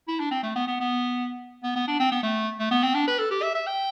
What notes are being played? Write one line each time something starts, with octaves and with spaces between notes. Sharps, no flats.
E4
D4
C4
A3
B3
B3
B3
B3
B3
D4
C4
B3
A3
A3
B3
C4
D4
B4
A4
G4
E5
E5
G5